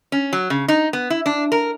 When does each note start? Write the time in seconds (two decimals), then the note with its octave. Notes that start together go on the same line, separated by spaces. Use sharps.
0.12 C#4
0.33 F#3
0.50 C#3
0.68 D#4
0.93 B3
1.10 E4
1.26 D4
1.52 A#4